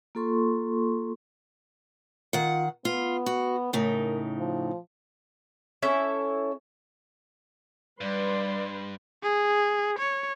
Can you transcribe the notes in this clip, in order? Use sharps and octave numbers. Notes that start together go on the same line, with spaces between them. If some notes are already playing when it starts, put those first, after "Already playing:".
A#3 F4 A4 C6 C#6
D#3 F4 F#5
B3 F4
F#4
A2 C#3 D#4 A#4
F3
C#4 E4 A4 E5
G2 G3 B4 D5 C6
G#4
C#5